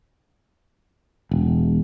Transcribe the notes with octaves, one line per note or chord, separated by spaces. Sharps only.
E1